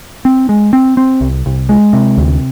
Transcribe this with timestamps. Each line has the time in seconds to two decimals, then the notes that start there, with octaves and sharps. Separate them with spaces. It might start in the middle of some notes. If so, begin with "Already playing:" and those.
0.25 C4
0.49 G#3
0.73 C4
0.97 C4
1.21 C2
1.46 C2
1.69 G#3
1.93 C3
2.18 D2